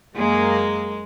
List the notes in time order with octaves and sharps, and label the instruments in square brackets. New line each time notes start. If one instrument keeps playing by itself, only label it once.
[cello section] F#2 A#3 G#4 [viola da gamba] G#3